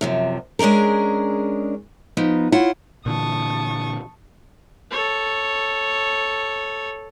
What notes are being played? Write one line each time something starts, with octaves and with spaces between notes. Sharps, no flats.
F#2 C3 F3
G#3 C#4 D4 G#4 A#4
F3 B3 D#4
E4 F4 C#5 F#5
A#2 D3 E3 A5 C#6 D#6
A4 C#5